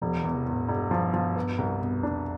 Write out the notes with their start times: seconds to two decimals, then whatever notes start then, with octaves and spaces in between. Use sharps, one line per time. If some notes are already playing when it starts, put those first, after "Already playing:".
0.02 E1 F3
0.18 E3
0.24 E2
0.35 C3
0.47 E2
0.53 A2
0.68 E1 G2
0.91 F3
1.14 F3
1.36 B3
1.58 C2
1.81 B2
2.03 F2 D4